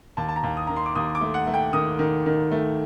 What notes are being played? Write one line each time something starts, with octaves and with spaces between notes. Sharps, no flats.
D#2 A5
A5
A#5
D#2
D#6
D#3 A#5
C6
D6
D#2 D#6
D6
A3
F#5
A3
G5
D#3 D#6
D#3
D#3
A3